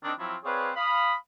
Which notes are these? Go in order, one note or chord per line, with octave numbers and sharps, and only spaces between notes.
D#3 C4 D4
F3 F#3 C4 E4 F4
C4 G#4 B4 C#5 D5 F5
F5 B5 D#6